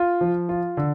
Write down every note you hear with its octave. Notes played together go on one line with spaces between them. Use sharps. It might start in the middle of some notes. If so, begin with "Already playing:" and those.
Already playing: F4
F3
F4
D3